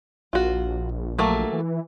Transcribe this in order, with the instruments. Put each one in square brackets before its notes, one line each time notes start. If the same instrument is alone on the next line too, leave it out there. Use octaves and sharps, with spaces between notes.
[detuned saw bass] A#1 [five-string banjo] F4 F#4
[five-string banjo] F#3 A3 A#3
[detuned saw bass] E3